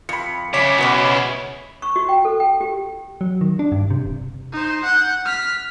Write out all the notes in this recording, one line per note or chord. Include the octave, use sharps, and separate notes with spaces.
F2 B5 C#7
C#3 E4 C#5 D6 B6
B2 B3 F#4
C#6
F#4
G5
A4
G5
G4
F#3
D#3
D4
G2
C3
E1
D#4 C5
F#5 G6
F6 B6